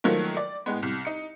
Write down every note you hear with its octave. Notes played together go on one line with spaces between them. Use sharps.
D#3 F3 F#3 A3 A#3
D5
A2 G#3 B3
C2
D#4 C#7